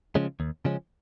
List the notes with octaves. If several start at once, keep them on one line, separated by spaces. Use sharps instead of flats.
C#3 F3 G#3 C#4
D#2
C#3 F3 G#3 C#4